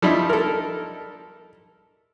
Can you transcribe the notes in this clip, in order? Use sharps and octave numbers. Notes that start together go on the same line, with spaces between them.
F3 G3 D#4 E4
A4 A#4